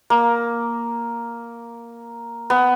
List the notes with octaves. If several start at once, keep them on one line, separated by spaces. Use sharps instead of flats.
A#3
B3